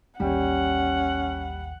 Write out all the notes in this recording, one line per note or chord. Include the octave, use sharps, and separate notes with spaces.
A1 D#2 G3 C#4 F#5 G5